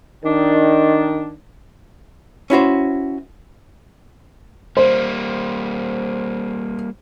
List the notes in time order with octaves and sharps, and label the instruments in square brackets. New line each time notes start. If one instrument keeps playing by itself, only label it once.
[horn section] D#3 D4
[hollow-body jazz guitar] C#4 E4 F#4 C5
[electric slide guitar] G3 A#3 [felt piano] C5